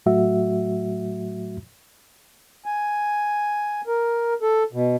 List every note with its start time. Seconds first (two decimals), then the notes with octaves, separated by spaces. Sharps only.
0.06 A2 F#3 A3 F#4 E5
2.66 G#5
3.87 A#4
4.42 A4
4.73 B2